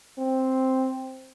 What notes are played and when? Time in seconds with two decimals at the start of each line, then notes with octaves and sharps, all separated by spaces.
0.18 C4